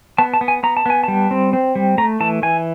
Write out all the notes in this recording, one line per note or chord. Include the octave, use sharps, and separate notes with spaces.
B3 A5
A5
B3
G#5
B3 A#5
A5
B3 G#5
G3 A5
C4
C4
G3
A3 A#5
E3 A5
E3 G#5